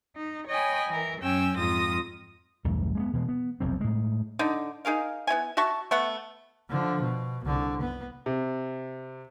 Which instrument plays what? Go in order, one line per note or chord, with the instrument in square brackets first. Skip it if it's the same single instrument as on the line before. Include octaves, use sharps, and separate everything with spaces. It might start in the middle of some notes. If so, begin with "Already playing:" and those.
[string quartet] D#4
C#5 D#5 G5 G#5 B5
E3 A#4
F#2 C#4 G5 G#5 E6
F2 G#2 F4 D#6 A#6
[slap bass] B1 E2 G2 A3
G#3 A#3 B3
B2 E3 G#3
B3
F1 B1 F2 C4
A2 G#3
[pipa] D3 D#4
D#4 G#4 A#4 F5
B3 C#4 E4 G#5
F#4 E5 A5 C#6
A3 B3 F#5
[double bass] D3 F3
B2
C2 D3
B3
[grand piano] C3